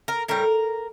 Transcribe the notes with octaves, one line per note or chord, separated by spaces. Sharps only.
A#4
A2 G3 A#4